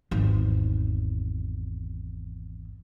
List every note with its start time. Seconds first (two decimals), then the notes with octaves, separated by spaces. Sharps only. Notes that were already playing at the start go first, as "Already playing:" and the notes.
0.11 G#1 E2